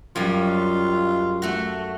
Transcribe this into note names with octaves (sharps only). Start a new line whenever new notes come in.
F#2 G3 F4 F5
A3 F#4